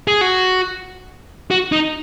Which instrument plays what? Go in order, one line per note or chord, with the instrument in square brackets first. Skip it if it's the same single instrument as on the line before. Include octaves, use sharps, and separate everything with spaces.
[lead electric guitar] G#4
F#4
F#4
D#4